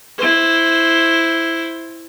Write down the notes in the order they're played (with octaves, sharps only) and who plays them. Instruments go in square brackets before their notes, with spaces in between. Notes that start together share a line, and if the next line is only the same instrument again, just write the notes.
[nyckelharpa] E4 C5